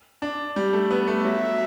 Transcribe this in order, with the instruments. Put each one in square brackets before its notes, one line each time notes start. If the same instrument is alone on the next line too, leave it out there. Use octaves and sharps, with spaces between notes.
[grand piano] D4
G3
A3
B3
A3
[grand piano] F#3 [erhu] E5